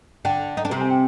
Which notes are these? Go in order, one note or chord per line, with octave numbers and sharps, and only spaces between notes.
D3 D4 G5
D#4
D4
C3 C4 A#5
G#5
G5